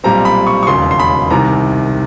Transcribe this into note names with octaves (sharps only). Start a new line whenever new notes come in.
B1 A#2 G3 C4 A#5
B5
C#6
C#6
E1 D#2 C#3 F#3 C6
C6
B5
C2 C3 D#3 A#5